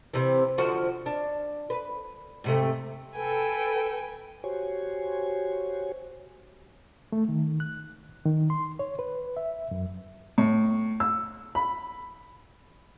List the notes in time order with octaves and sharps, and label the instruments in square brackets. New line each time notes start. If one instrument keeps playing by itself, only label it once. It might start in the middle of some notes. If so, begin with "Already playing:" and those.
[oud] C3 E3
D3 F3 F#4
D4
B4
G#2 C3 A3
[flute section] A4 [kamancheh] B4 G5 [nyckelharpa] G#5
[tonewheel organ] F#4 G4 C5 C#5 G#5
[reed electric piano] A3
D#3
F#6
D#3
C6
C#5
B4
E5
F#2
[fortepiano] A2
E6
B5